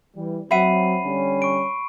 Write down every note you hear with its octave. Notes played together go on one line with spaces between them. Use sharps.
E3 G3
F#3 C4 E5 F#5 B5 C7 D#7
D3 G3 C#4
C#6 D7